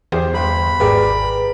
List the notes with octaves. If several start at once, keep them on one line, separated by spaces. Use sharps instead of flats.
E2 G4 G#4 C5
G1 G5 B5 C6
G#1 G4 G#4 A#4 B4 D5